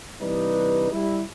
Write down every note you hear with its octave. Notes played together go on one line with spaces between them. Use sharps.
C3 E3 G3 D4 D#4 B4
G3 E4